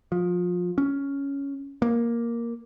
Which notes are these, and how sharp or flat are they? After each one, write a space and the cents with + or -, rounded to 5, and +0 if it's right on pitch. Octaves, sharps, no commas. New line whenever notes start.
F3 +25
C#4 +5
A#3 +5